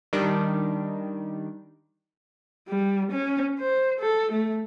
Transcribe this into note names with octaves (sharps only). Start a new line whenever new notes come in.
D#3 G3 D4
G3
C#4
C5
A4
A3